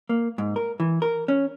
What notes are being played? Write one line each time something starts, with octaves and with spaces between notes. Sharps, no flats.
A#3
G#2
A#4
E3
A#4
C#4